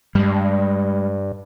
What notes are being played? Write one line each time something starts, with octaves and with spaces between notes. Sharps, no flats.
G2 G3 G#3